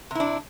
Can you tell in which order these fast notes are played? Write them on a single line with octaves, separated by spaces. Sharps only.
C3 E4 D4